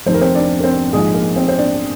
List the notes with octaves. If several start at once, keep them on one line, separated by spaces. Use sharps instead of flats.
F1 F2 D#3 C5
A#4
C4 C5
D4 D5
A#4
C4 C5
A#1 G#2 F3 G#3 G#4
A#3 A#4
C4 C5
C5
D4 D5